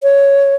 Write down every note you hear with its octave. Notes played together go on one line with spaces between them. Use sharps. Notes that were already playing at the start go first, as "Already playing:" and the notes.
C#5